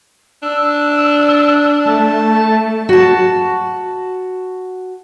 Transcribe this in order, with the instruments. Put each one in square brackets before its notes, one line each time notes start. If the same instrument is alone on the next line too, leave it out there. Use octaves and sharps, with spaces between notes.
[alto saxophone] D4 [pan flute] E6
[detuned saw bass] A3 [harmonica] A5
[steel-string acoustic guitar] F#4 A5